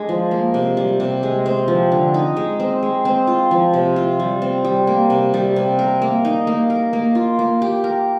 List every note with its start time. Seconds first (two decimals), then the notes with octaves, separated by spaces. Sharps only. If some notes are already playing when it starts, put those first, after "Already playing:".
Already playing: G#3 D4
0.09 F3
0.31 A#3
0.54 C3
0.77 G3
1.00 C3
1.23 G#3
1.46 C4
1.68 F3
1.92 D3
2.14 D#4
2.37 G#3
2.60 C4
2.83 G#3
3.05 C4
3.27 F4
3.51 F3
3.73 C3
3.96 F4
4.20 G3
4.42 C4
4.64 G3
4.87 A#3
5.10 C3
5.34 G3
5.56 C3
5.79 A#4
6.02 A#3
6.25 D#4
6.47 A#3
6.70 A#4
6.93 A#3
7.15 F4
7.39 A#3
7.62 G4
7.84 A#4